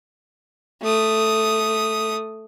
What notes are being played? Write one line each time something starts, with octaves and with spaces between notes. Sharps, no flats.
A3 D#6